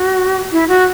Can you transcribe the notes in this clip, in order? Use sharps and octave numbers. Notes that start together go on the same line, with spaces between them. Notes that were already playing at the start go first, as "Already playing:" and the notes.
Already playing: F#4
E4
F#4